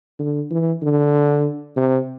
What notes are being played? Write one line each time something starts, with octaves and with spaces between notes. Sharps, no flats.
D3
E3
D3
C3